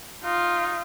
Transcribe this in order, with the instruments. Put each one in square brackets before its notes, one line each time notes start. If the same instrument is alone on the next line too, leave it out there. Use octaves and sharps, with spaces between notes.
[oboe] D#4 [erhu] F4